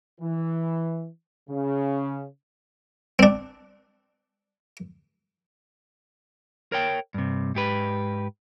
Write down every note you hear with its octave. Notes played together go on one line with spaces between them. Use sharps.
E3
C#3
C4 D4
A#4 C#5 G5
G2 C3
G#2 G4 B4